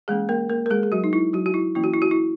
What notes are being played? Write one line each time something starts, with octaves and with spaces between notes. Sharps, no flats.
E3 G#3 A#3 C#4 G#4
A#3 A#4
A#3 A#4
A#4
G#3 G#4
G#4
F#3 F#4
D#4
E4
F#3 F#4
F#4
E4
E3 A#3 C#4 E4
F#4
E4
F#4
E4